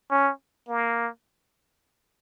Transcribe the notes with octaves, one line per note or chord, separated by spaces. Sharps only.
C#4
A#3